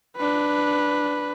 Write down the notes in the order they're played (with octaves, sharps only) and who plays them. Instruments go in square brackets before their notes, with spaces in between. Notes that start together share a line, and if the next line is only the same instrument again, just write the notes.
[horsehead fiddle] D4 B4